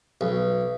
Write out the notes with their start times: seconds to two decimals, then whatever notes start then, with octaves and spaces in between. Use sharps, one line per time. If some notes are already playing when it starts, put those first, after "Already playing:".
0.21 B1